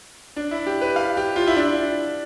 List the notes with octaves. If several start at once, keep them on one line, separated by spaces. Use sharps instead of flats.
D4
E4
G4
B4
F5
G4
F4
E4
D4